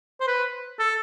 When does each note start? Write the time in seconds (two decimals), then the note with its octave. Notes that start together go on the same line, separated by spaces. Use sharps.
0.21 C5
0.27 B4
0.79 A4